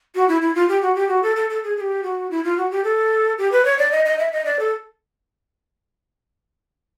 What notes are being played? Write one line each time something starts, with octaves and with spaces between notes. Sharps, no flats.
F#4
E4
E4
F4
G4
F#4
G4
F#4
A4
A4
A4
G#4
G#4
G4
F#4
E4
F4
F#4
G4
A4
G4
B4
C#5
D5
D#5
D#5
E5
D#5
D5
A4